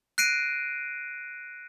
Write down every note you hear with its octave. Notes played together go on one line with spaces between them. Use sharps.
F#6 A#6 C7 D7 D#7